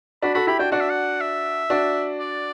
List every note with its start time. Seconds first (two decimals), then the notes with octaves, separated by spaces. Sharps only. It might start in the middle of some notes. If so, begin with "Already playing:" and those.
0.22 D4 F#4 B5
0.35 F#4 A4 B5
0.47 E4 G4 B5
0.59 D4 F#4 G5
0.72 D4 F#4 F#5
0.80 E5
0.90 F#5
1.21 E5
1.70 D4 F#4
2.19 D5